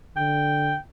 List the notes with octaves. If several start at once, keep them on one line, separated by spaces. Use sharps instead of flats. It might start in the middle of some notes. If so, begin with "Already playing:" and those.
D3 G5